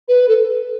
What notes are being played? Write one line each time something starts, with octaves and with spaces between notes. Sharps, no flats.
B4
A4